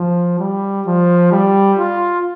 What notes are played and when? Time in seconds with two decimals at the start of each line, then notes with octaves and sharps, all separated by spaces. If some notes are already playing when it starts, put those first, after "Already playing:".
Already playing: F3
0.40 G3
0.87 F3
1.32 G3
1.79 F4